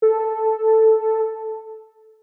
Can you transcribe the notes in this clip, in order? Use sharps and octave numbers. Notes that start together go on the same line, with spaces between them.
A4